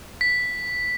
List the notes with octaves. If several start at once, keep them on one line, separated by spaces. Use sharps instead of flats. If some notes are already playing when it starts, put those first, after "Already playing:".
B6